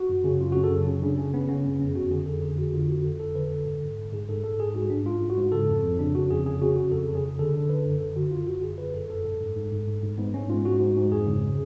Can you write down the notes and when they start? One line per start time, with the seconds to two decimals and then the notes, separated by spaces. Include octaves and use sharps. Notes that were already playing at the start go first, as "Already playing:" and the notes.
Already playing: F#4
0.09 F#2
0.24 C#3
0.41 F#2 F4
0.52 F#2 F#4
0.64 A4
0.71 C#3
0.87 C#3
1.02 C#3 D4
1.17 C#3 C#4
1.33 C#3 B3
1.49 C#3 C#4
1.64 F#2 B3
1.79 F2 C#4
1.96 F2 F#4
2.11 D3 G#4
2.26 F2 A4
2.42 D3 G#4
2.57 F2 F#4
2.74 D3 F4
2.89 F2 F#4
3.04 F2 A4
3.20 F2 A4
3.35 D3 B4
3.43 A4
3.51 D3
3.66 G#2
3.82 G#2
3.98 G#2
4.12 G#2 G#4
4.28 G#2 A4
4.44 G#2 A4
4.60 G#2 G#4
4.74 G#2 F#4
4.90 G#2 D4
5.05 G#2 F4
5.21 G#2
5.30 F#4
5.37 G#2
5.52 C#3 A4
5.68 F2
5.83 F2
5.99 C#3 D4
6.15 C#3 F#4
6.30 F2 G#4
6.46 C#3 G#4
6.62 C#3 F#4
6.76 C#3 F#4
6.92 F2 A4
7.07 C#3
7.15 G#4
7.23 C#3
7.39 D3 A4
7.54 D3 A4
7.69 D3 B4
7.85 F#2 A4
8.01 F#2 A4
8.16 D3 F#4
8.31 F#2 F4
8.47 F#2 F#4
8.62 F#2 G#4
8.78 D3 B4
8.94 F#2 A4
9.10 F#2 A4
9.25 G#2
9.40 G#2
9.56 G#2
9.71 G#2
9.87 G#2
10.02 G#2
10.18 G#2 B3
10.34 G#2 C#4
10.49 G#2 F4
10.65 G#2 F#4
10.80 G#2
10.96 G#2
11.11 F2 G#4
11.27 C#3